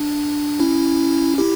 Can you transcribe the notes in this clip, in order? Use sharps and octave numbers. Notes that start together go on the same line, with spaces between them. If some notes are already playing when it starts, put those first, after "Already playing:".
Already playing: D4
C#4 E4
E4 G4